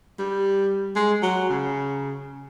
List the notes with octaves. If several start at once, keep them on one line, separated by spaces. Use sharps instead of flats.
G3
G#3
F#3
C#3